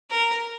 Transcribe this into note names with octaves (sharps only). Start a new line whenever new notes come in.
A#4